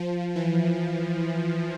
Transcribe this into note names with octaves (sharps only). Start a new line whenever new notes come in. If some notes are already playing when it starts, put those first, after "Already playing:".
Already playing: F3
E3